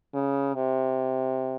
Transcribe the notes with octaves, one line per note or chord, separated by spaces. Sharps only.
C#3
C3